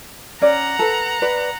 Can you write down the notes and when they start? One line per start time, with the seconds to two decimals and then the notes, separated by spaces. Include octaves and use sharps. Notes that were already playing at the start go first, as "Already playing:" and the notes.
0.42 C#4 D5 F#5 A#5
0.79 A4 B4
1.22 B4 D5